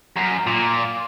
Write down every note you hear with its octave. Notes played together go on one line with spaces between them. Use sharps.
F#2
A#2